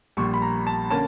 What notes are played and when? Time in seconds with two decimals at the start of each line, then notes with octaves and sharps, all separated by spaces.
0.17 A#1 A#2 G3 C#6
0.34 B5
0.42 A#5
0.67 A5
0.90 D3 A#3 C#4 A5